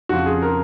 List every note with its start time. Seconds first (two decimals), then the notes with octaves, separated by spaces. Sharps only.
0.09 F2 C#3 F3 F#4
0.26 G#4
0.42 A#4